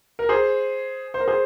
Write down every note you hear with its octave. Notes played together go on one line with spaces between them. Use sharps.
A#4
G#4 C5
C5
A#4
G#4 C5